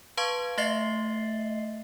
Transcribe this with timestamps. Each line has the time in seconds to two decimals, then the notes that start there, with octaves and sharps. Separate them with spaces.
0.17 B4 F5 A5 C6 C#6 G#6
0.58 A3 D#5 E5 A6 C7